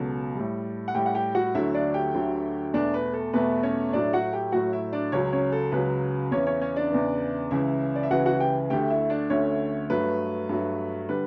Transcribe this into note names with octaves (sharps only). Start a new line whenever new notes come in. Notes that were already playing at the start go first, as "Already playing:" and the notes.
Already playing: C#2 B2 F#3 A4
A2 G3
F#5
A2 G3 G4 G5
F#5
G4 G5
F#4 F#5
D2 D3 F#3 A3 E4 E5
D4 D5
G4 G5
D2 D3 F#3 A3
E2 B2 A3 D4 D5
B4
A4
E2 B2 A3 B4
C#4 C#5
A2 F#3 A3 D4 D5
F#4 F#5
G4 G5
A2 F#3 A3 F#4 F#5
E4 E5
D4 D5
C#2 C#3 F#3 C#4 C#5
C#4 C#5
A4
C#2 C#3 F#3 B4
E2 C#3 E3 C#4 C#5
C#4 C#5
C#4 C#5
D4 D5
E2 C#3 E3
C#2 C#3 E3 E4 E5
D5
E5
C#2 C#3 E3 F#4 F#5
F#4 F#5
G4 G5
D2 D3 A3 G4 G5
E4 E5
D4 D5
D2 D3 A3 C#4 C#5
G2 F#3 A3 B4
G2 F#3 A3
D3 G3 B4